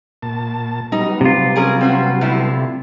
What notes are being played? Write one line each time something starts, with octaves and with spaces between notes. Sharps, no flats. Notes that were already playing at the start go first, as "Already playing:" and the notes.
A#2 A5
F#3 G3 B3 D#4
C3 F4
C#4 G#4 A#4
C4 C#4 F#4
A2 D3 E4